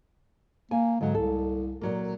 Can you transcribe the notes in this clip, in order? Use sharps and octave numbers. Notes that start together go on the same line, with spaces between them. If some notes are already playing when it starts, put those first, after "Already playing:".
A#3 G#5
G#2 D3 F#3
C2 A4
A#2 F#3 A#3